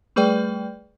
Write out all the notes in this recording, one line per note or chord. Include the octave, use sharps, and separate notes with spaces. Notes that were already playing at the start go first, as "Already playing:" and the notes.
G3 A3 G#4 B4 D5 G5